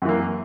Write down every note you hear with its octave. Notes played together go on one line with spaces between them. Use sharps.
F#2 E3 A#3